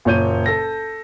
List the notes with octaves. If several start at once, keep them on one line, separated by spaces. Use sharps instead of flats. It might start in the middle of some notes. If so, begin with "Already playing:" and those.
F#1 A#2 C#5 G6 D#7
A4 A#6